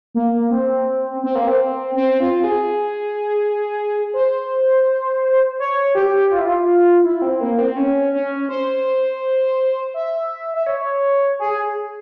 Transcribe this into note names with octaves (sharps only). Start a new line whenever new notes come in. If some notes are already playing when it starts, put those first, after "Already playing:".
A#3
C4
C4
A#3
C4
C4
F4
G#4
C5
C#5
G4
F4
E4
F4
E4
C4
A#3
C4
C#4
C#4
C5
E5
E5
C#5
G#4